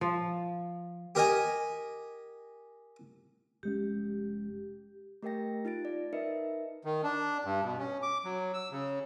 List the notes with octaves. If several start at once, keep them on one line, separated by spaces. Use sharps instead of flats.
F3
G4 A#4 D#5 G#5
F1 G#3 C#4 G4
A3 G4 A#4 D#5 G5 A#6
D#4 F4 A6 D7
D5
D#4 A#4 B4 D#5 E5 C#7
D#3
D4
G2
B2
C#4
D6
F#3
E6
C#3